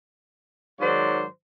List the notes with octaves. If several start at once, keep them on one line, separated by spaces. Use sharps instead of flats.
G#2 D#3 F#3 C5 D5